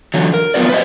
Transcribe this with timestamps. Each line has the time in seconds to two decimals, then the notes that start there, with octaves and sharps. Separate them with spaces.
0.14 D3 E3 F#3
0.34 A#4
0.54 F2 F#3 B3 F4 B4 D5
0.70 B4 C5 D#5